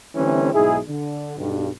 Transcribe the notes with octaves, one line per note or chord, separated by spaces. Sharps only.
D3 E3 G3 A3 C4 C#4
B1 G#2 D#4 E4 G#4
D3
B1 G2